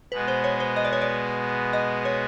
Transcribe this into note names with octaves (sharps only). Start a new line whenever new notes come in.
B2 G#3 B3 B4
C5
C#5
C5
D#5
D5
C#5
D5
D#5
C#5